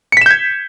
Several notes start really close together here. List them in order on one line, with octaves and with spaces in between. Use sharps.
C#7 B6 E7 G6 G#6